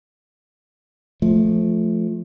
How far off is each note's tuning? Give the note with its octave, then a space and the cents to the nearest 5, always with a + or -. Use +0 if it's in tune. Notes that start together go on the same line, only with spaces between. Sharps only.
F3 +0 A3 -15